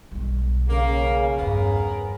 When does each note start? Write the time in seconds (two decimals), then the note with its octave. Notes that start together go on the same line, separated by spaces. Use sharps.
0.11 B1 G3
0.68 C#3 A#3
1.37 E2 G2 B3 G#4 A#4